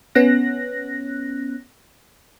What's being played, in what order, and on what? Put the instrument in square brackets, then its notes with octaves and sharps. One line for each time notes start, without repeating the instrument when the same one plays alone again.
[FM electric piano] B3 C#4 F#6 A#6